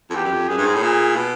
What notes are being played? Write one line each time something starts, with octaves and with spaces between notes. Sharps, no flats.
F2
E2 G4
F#2
F2
F#2 G#4
G2
G#2
A2
A#2 G#4
B2